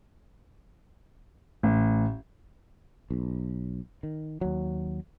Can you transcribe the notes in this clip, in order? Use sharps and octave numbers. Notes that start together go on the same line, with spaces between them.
A1
B1
D#3
D#2 F#3